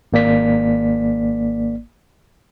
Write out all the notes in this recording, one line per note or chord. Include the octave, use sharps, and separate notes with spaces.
G#1 A#3 D5 B6